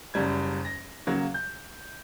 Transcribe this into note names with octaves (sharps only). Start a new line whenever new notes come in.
F#1 F#2 G3 G#6
A#6
C#3 F#3 A#3
G6